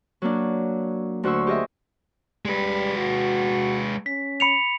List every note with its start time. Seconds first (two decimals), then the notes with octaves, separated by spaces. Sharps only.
0.22 F#3 A#3 D4
1.23 D2 D4 F#4 C5 C#6 E6
1.47 G4 G#4 D#5 E5
2.45 G3 G#3 B4
2.97 F#4
4.06 C#4 B6
4.40 B5 C#7 F7